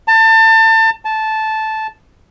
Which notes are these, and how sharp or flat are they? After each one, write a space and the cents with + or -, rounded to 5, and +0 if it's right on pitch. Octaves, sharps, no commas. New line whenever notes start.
A5 +30
A5 -10